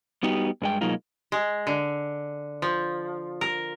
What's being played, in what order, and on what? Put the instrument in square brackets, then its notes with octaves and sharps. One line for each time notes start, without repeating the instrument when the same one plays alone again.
[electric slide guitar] G3 B3 D#4 F#4 G4
G2 G#3 G5
B2 F#3 G#3 A#3 D#4 F4
[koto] G#3
D3
F3
A#4